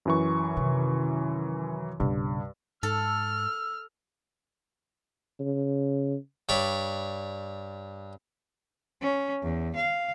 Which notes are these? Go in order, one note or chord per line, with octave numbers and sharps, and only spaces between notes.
F#2 E3 C#6
C3 D#3
B1 G2 C#3
G#2 A4 E6 F6
C#3
G2 C#5 D5 B5
C#4
E2
F5